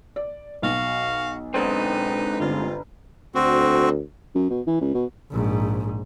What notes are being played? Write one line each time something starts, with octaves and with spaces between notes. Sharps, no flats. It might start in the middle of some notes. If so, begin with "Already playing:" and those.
D5
B1 F#4 F5
G#2 D3 C4 D#4 B4
G1 C3 F4
D2 C4 F#4
F#2
B2
E3
C#2
B2
A#1 G#2